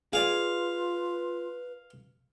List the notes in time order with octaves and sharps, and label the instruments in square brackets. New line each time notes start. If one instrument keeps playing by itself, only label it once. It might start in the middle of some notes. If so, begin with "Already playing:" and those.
[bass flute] F4 [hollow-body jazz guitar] G#4 D5 [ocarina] B4 [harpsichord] F5